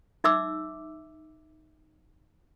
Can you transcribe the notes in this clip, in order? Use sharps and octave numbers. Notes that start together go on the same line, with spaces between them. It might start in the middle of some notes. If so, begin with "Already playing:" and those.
D#4 E5 D6 E6